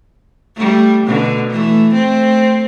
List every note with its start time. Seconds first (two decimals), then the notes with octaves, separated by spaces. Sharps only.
0.56 G3 A3
1.06 B2 D3
1.50 E3 A3
1.94 A3 C4